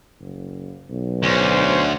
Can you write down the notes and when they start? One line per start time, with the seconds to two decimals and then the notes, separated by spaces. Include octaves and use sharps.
0.20 F#1
0.89 B1
1.23 D2 C#4 D4 C5